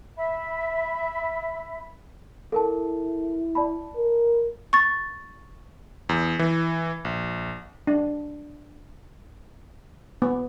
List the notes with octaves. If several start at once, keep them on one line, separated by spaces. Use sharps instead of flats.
E5 B5
E4 A4 A#4 A5
D5 A5 B5
A#4
C#6 A6
E2
E3
A#1
D4
B3